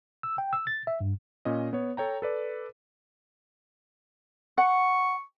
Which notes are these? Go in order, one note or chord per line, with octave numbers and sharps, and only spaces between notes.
E6
G5
E6
A6
E5
G2
A#2 C#4 D#5
B3 C#5
A4 C#5 G5 A#5
A4 B4 D5
F#5 C#6